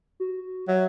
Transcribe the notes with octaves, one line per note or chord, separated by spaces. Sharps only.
F#4
F#3 E5